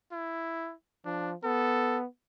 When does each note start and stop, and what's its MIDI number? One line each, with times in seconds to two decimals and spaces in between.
0.12 0.74 64
1.06 1.35 53
1.06 1.31 62
1.44 2.06 59
1.44 1.98 69